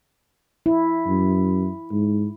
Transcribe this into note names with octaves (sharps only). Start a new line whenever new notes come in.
E4
F#2
G#2